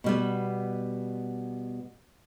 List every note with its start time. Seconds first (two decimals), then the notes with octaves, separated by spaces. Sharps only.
0.04 B2 G3 B3